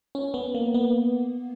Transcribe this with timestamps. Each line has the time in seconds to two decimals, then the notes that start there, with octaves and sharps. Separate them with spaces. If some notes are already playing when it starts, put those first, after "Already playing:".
0.15 C#4
0.34 B3
0.55 A#3
0.74 B3